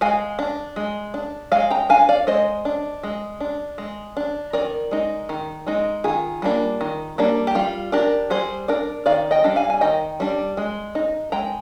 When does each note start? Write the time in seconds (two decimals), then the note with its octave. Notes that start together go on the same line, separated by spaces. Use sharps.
0.01 G#3 F5 G#5
0.39 D4
0.76 G#3
1.14 D4
1.52 G#3 F5 G#5
1.70 G5 A#5
1.89 D4 F5 G#5
2.09 D5 F5
2.27 G#3 C5 D#5
2.65 D4
3.03 G#3
3.40 D4
3.78 G#3
4.17 D4
4.53 D#3 A#4 D5
4.91 G#3 D#4
5.29 D#3
5.67 G#3 D#4
6.04 D#3 F4 G#4
6.42 G3 A#3 D4
6.81 D#3
7.18 G3 A#3 D4
7.47 G4
7.55 G3 F4
7.92 D4 G4 A#4
8.30 G3 G#4 C5
8.68 D4 A#4 D5
9.06 D#3 D5 F5
9.31 D#5 G5
9.44 G3 D4
9.56 F5 G#5
9.70 G#5
9.81 D#3 D#5 G5
10.20 G3 D4
10.57 G#3
10.95 D#4
11.32 G#3 G5 A#5